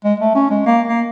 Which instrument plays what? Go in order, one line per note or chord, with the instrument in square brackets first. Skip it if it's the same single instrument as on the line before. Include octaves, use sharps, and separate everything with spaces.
[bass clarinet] G#3
A3
C#4
G#3
A#3
A#3